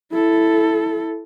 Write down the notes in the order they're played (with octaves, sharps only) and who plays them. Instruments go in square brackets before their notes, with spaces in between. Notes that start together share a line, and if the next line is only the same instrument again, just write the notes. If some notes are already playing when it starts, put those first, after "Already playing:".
[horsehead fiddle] E4 A4